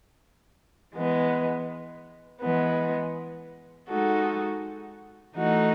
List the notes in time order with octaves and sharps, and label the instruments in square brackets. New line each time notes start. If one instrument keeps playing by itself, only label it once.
[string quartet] E3 G#3 B3
E3 G#3 B3
G#3 D#4 F#4 A4
E3 A3 D#4 F#4